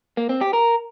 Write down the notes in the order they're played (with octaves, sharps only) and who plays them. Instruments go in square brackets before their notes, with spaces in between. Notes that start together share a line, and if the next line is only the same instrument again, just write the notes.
[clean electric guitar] A#3
C4
G4
A#4